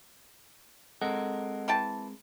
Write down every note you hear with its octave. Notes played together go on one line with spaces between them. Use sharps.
G#3 C4 A4 A#4 D#5 F#5
E3 G5 A5